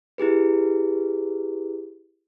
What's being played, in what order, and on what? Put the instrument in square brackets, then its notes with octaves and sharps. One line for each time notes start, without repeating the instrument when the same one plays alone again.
[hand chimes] E4 G4 G#4 B4